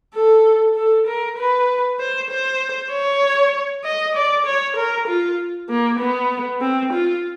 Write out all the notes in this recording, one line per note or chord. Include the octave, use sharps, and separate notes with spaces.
A4
A4
A#4
B4
C5
C5
C#5
D#5
D5
C#5
A#4
F4
A#3
B3
C4
F4